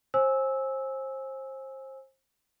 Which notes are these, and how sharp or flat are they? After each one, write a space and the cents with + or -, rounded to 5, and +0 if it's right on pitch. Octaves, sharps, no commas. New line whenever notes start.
C5 +30 G#5 +0 E6 -15